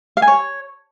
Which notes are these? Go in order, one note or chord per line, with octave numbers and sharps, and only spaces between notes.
F5
G#5
C#5